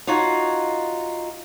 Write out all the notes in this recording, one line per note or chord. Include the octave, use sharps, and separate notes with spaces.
D#4 F4 F#4 C#5